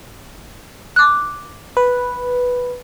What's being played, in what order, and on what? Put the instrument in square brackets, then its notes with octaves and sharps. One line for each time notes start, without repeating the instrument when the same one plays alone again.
[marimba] D6 F#6
[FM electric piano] B4